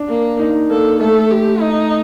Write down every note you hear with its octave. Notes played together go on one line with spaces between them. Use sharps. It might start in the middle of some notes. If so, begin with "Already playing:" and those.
Already playing: D4
A#3
D#4
A#3 A4
A3 A4
G4
D#4